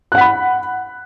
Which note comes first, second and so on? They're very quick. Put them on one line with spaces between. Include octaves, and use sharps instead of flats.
F#6 F#5 B6 B5